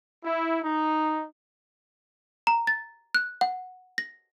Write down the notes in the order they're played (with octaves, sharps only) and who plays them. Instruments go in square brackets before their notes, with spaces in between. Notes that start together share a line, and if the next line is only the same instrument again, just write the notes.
[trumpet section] E4
D#4
[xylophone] A#5
A6
F#6
F#5
A#6